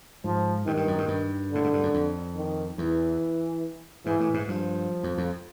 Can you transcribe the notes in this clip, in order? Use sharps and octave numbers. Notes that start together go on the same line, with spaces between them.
G#2 F3
G2 D#3
G2
F#2
G2
G2
A2 D3
G#2
G2
F#2
F2
D#3
E2 E3
G#2 E3
A2
G#2
G2 F3
F2
F2